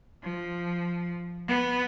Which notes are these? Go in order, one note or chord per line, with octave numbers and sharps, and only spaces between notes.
F3
B3